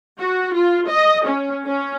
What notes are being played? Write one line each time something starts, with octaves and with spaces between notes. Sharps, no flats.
F#4
F4
D#5
C#4
C#4